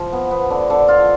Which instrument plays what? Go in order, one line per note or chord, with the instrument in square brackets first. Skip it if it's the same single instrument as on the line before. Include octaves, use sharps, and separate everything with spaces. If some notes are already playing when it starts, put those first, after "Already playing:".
Already playing: [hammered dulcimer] F3
B3
B3
D3
D3
F4